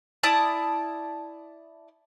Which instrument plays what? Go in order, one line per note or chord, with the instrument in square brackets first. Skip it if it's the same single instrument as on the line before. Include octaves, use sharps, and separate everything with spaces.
[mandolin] E4 D5 A5 D#6